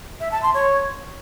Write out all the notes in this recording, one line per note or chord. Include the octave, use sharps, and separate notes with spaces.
E5
A5
C6
C#5